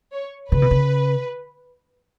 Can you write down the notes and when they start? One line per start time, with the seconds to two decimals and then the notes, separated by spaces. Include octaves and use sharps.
0.13 C#5
0.52 C#3 B4
0.62 B2
0.71 C#3